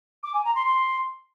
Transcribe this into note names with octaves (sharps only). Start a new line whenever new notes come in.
D6
G#5
A#5
C6
C6